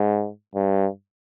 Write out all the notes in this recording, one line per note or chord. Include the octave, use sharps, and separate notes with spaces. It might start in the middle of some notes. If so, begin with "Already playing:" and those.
Already playing: G#2
G2